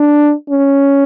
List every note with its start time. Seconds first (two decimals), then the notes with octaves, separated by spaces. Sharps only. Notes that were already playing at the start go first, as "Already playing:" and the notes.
Already playing: D4
0.50 C#4